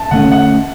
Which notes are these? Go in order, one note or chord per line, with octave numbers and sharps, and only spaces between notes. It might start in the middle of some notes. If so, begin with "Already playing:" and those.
Already playing: A5
D3 A3 C#4 F#5
F#5